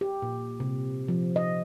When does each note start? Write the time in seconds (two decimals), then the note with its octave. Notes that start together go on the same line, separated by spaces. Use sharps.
0.01 G4
0.22 A#2
0.60 C3
1.08 F3
1.36 D#5